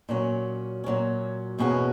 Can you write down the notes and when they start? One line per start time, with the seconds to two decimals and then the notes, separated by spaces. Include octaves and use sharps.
0.09 A#2 F#3 C#4
0.84 A#2 F#3 C#4
1.59 E2 B2 A#3 C#4 F#4